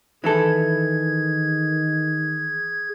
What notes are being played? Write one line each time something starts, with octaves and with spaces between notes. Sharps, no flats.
D#3 E3 E4 G#4 A4 G#6